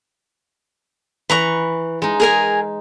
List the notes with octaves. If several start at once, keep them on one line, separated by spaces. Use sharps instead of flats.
E3 B4 A#5 C#6
G#3 D#4
G#4 A#4 G#5